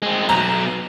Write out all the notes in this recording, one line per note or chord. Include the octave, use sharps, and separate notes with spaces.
G#3 C4
B1 B2 A#5